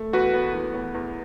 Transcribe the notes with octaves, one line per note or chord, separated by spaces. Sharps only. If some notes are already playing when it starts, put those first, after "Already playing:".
Already playing: A3
E2 F#4 B4
B3
E3
B3
E2